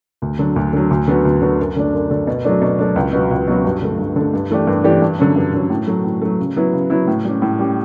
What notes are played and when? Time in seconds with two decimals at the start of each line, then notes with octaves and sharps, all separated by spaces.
0.22 D2
0.39 D3 F#3
0.56 D2
0.73 D3 F#3
0.90 D2
1.08 D3 F#3 B3 F#4
1.25 D2
1.42 D3 F#3 B3 F#4
1.59 F#2
1.76 D3 A3 D4
1.93 F#2
2.10 D3 A3 D4
2.27 B2
2.45 F#3 A3 D4
2.62 B2
2.79 F#3 A3 D4
2.96 C#2
3.13 B2 F#3 B3 F#4
3.31 C#2
3.48 B2 F#3 B3 F#4
3.65 G2
3.82 D3 A3
3.99 G2
4.16 D3 A3
4.33 G2
4.50 E3 A3 D4 G4
4.67 G2
4.84 E3 A3 D4 G4
5.02 G2
5.19 D3 F#3 C#4
5.36 G2
5.53 D3 F#3 C#4
5.70 A2
5.88 F#3 A3
6.05 A2
6.22 F#3 A3
6.39 C#3
6.56 F#3 B3 E4
6.73 C#3
6.90 F#3 B3 E4
7.08 A2
7.25 G3 C#4 G4
7.42 A2
7.59 G3 C#4 G4